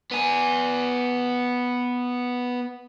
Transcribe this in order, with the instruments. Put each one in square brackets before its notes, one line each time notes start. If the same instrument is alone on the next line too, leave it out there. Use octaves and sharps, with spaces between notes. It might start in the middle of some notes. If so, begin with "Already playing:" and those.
[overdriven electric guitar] B3 G#5